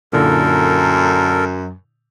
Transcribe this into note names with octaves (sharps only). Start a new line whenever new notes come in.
F#2 A#2 D3 E4 A4 A#4